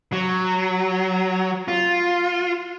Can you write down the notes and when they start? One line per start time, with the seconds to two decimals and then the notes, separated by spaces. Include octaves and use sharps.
0.12 F#3
1.68 F4